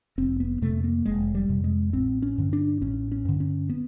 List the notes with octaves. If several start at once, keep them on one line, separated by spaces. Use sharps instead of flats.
F1 C4
B3
F2 C3 A3
A#3
F1 G#3
G3
F2 C3
G#3
A1 C4
C#4
G2 D3
D4
A1 C#4
C#4
G2 D3
C#4
B3